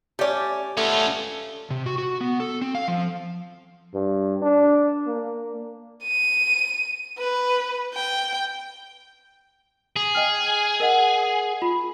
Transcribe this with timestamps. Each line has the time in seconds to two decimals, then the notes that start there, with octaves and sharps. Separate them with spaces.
0.19 A3 C#4 G4 D5
0.78 A3 B3 C#4 F4
1.71 C3
1.86 F#4
1.98 F#4
2.21 B3
2.40 A4
2.62 C4
2.75 F5
2.88 F3
3.94 G2
4.42 D4
5.07 A#3
6.04 D#7
7.18 B4
7.94 G5
9.96 G#4
10.15 D#5 G5 F6
10.80 A#4 D#5 F#5
11.62 F4 B5